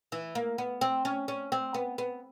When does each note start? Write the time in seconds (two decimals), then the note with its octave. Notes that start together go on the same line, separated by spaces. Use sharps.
0.12 E3
0.35 A#3
0.58 B3
0.81 C4
1.05 C#4
1.28 C#4
1.52 C4
1.74 B3
1.98 B3